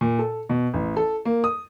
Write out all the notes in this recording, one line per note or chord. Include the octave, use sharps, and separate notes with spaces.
A#2
A4
B2
A1
A4
A#3
D#6